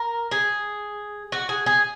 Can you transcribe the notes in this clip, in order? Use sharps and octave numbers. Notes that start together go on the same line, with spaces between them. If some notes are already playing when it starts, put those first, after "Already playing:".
Already playing: A#4
G#4
F#4
G#4
G#4